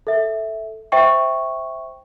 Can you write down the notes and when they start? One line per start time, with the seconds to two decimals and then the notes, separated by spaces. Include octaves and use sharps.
0.07 A4 E5
0.92 C5 E5 G5 C#6